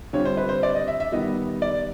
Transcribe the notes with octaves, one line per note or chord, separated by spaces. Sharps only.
D3 G3 C4 F4 C#5
C5
B4
C5
D5
D#5
E5
E5
D#3 G3 B3 D#5
D5